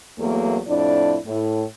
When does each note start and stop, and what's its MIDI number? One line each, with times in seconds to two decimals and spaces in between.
0.19 0.59 40
0.19 0.59 54
0.19 0.59 57
0.19 0.59 58
0.68 1.17 41
0.68 1.17 45
0.68 1.17 62
0.68 1.17 64
0.68 1.17 74
1.27 1.64 45